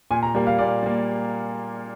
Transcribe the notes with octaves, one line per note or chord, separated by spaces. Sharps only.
A#2 G#5
A#5
G3 A#3
F5
A#2 D5
G3 A#3